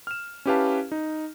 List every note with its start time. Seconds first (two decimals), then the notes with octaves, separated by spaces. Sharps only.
0.07 F6 E7
0.45 C#4 E4 G4 B4 F5 A5
0.92 D#4